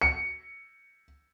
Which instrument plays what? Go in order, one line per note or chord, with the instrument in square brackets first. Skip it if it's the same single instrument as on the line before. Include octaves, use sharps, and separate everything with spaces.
[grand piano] C#7